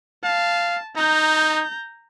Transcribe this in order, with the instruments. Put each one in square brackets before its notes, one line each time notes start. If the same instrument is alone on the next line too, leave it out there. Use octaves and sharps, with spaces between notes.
[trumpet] F5 [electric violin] A5
[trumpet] D#4 [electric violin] A#5 G6